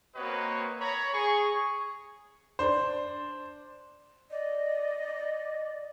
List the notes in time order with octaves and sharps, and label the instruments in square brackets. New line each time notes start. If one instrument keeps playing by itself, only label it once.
[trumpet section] A#3 C4 F#4 B4 C#5 D#5
C#5 A#5 B5
G#4 C#6
[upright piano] D4 C5
[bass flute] D5 [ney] D#5